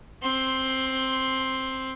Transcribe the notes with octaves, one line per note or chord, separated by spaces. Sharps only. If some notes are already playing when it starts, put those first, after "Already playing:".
C4 C6